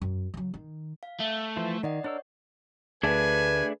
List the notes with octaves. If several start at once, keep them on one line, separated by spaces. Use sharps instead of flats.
F#2
C#3 F#3
D#3
F5
A3 E5
E3 F3 C5
D#3 D5 D#5 F#5
D4 A#4 C#5 E6
D2 A3 D4 G#4 B4 G#5